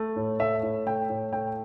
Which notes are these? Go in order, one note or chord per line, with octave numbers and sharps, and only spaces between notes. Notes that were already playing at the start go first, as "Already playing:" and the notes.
Already playing: A3
A2
A3 E5
A2
A3 G5
A2
A3 G5